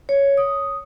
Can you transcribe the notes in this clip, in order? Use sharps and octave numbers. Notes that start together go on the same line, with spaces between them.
C#5
D#6